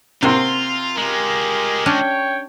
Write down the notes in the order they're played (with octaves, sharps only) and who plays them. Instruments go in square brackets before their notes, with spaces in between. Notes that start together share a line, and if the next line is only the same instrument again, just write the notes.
[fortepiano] C3 A#3 C4 [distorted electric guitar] F4 [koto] F#4 F5
[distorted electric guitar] G#3 F4 [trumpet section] G4 G#4 A#4
[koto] C#4 D4 G4 [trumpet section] C#5 G5